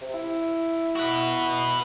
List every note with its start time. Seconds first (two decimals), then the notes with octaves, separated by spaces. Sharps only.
0.02 C3
0.14 E4
0.96 F#4 B4